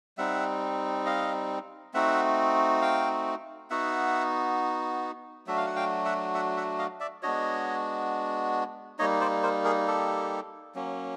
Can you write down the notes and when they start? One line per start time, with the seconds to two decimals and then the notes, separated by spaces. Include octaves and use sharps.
0.18 G3 C4 D#4 E5 F#5
1.06 D#5 F5
1.94 A3 C4 D#4 F#4 E5 F#5
2.81 F5 G5
3.70 B3 D#4 F#4 E5 F#5
5.47 F#3 A3 D4 F#4 E5
5.57 F5
5.67 F#5
5.76 F5 G5
6.05 E5 F#5
6.34 E5 F#5
6.57 E5 F#5
6.79 D#5 F5
7.00 D5 E5
7.22 G#3 B3 D4 F#4 C#5 D#5
8.99 G3 A#3 D#4 C#5 D#5
9.21 C5 D5
9.43 A#4 C5
9.65 G#4 A#4
9.87 G4 A4
10.75 F#3 A#3 C#4